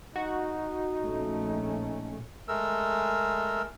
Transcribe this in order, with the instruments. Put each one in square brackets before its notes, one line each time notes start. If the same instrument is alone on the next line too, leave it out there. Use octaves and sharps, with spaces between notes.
[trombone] D#4 [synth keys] F#4
[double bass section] A#1 A3 C#4
[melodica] G#3 A3 A#4 E6